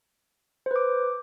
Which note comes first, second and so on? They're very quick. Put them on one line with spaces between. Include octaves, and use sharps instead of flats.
C5 B4 D6